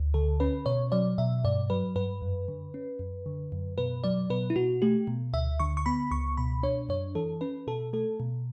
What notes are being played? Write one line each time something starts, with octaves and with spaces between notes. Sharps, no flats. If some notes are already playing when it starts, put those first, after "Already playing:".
Already playing: D2
D3 A4
C#4 B4
B2 C#5
F#3 D5
B2 E5
G2 D5
F#3 B4
G2 B4
F#2
D3
C#4
F#2
D3
F#2
B2 B4
F#3 D5
B2 B4
E4
B2 F#4
A3 G4
B2
D2 E5
D3 C#6
C#6
B3 B5
C#2 C#6
B2 B5
D4 C#5
F#2 C#5
E3 A4
C#4 B4
B2 A4
A3 A4
B2